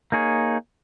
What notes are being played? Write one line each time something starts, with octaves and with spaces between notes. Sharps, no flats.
A#3 D#4 G#4 C#5